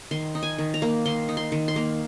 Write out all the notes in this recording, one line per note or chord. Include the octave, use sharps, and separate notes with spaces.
D#3 C6
D#4
G#5
D#3
A#5
A#3
D#3 C6
D#4
C6
D#3
C6
A#3